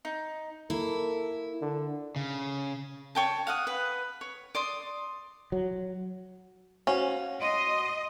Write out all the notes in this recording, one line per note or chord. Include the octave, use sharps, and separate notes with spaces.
D#4
A#3 E4 A4
D3
C#3
C#5 G5 A5
F5 F#5 D#6
B4
C#5
D5 C6 D#6
F#3
C#4 F#4 C5 F5
D#5 C6